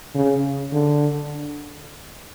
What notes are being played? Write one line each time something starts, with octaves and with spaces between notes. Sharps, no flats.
C#3
D3